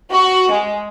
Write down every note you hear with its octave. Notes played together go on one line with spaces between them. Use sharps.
F#4
G#3